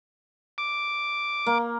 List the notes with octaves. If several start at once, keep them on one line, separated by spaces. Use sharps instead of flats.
D6
A#3